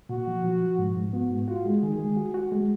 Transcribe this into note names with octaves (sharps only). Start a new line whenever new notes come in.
A#2 F#4
F3
F3
F3
G#2
G#2
B3 F#4
G#2
F4 F#4
G#3
D#3 G#4
G#3
F#4
F#4
G#3